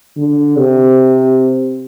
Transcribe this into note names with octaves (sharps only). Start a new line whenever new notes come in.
D3
C3